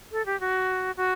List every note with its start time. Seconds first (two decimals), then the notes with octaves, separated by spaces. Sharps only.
0.12 A4
0.26 G4
0.40 F#4
0.97 F#4